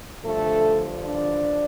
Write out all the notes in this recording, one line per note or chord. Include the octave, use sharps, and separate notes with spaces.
G2 D3 F3 A3 A4
D4 D5